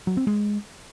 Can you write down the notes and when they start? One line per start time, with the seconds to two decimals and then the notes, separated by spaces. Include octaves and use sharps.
0.07 F#3
0.17 C4
0.27 G#3